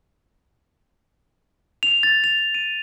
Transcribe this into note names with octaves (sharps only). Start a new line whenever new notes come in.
F7
A6
F7
D#7